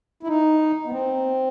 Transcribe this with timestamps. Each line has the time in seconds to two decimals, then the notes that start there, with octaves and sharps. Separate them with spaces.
0.23 E4
0.27 D#4
0.86 B3
0.91 C4